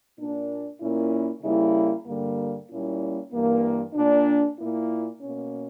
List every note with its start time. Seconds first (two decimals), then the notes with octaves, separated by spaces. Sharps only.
0.17 A#2 A#3 D4
0.79 A#2 A#3 C#4 E4
1.42 C#3 G3 A#3 E4
2.06 G2 D3 G3 A#3
2.69 A#2 G3 A#3 C#4 E4
3.31 G2 E3 A#3
3.94 A#2 A#3 D4
4.57 A#2 A#3 E4
5.20 B2 A#3 C#4